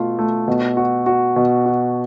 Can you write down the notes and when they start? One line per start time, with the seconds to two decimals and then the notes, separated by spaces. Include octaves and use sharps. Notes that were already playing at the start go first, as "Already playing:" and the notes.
Already playing: B2 A3 F4
0.19 A3
0.48 B2
0.77 F#4
1.06 F#4
1.36 B2
1.66 F#4